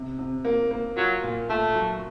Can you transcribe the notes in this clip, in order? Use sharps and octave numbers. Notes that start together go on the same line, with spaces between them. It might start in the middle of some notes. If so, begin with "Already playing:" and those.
Already playing: C3
C3
A#3
A#3
F#3 F4
A#2
A#2 A3
F#3